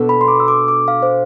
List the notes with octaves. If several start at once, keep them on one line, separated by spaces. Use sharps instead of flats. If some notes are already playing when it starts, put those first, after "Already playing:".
Already playing: B2 B3 D4 A4
B5
C6
D6
E6
D6
D6
F5
C5